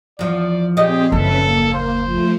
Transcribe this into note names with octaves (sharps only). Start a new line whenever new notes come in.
E2 F3 D5
A#2 C4 G4 G#4 D#5
F#1 D#2 C#4 A4 B4 E5
A#3
C5
F3 A3